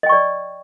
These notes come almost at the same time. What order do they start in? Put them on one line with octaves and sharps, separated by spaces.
D#5 G5 C#6 D5